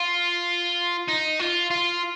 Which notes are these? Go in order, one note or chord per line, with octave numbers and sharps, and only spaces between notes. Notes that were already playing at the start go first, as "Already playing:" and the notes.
Already playing: F4
D#4
F4
F4